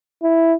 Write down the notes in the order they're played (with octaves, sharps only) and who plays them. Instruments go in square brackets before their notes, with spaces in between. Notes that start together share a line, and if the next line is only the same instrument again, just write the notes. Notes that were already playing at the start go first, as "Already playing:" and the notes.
[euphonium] E4